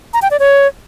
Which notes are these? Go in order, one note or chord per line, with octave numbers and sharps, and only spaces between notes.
A#5
G5
D5
C#5